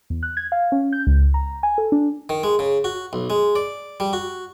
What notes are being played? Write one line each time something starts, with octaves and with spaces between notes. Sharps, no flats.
E2
F#6
G#6
F5
C#4
G6
C#2
A#5
G#5
A4
D4
D#3
G#3
C#3
F#4
B1
G#3
D5
G3
F#4